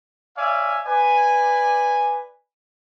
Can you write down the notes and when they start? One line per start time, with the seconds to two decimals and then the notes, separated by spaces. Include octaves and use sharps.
0.36 C#5 D5 E5 F5 G#5
0.86 B4 D5 G#5